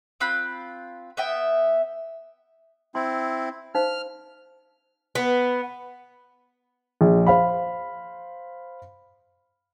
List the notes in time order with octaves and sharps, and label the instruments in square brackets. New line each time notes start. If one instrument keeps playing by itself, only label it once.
[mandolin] C4 F4 B5 F#6
B3 E5 G5
[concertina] C4 E4 [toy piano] C6
[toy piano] D#4 C5 F5 [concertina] F6
[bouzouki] B3
[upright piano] A#1
C5 F5 B5